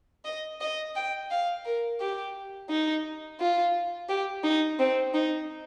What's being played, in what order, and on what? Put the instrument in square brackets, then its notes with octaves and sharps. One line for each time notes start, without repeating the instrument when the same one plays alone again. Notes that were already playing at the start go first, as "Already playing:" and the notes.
[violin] D#5
D#5
G5
F5
A#4
G4
D#4
F4
G4
D#4
C4
D#4